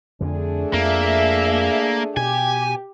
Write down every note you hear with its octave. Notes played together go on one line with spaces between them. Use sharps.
F2 D3 A3 D4 G#4
F2 A#3 E5
B2 G4 G#5